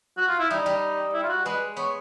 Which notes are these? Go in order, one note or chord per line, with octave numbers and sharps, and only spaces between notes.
F#4
F4
E4
G3 D#4
G3
E4
F4
F#4
G#3 B4
B3 C#5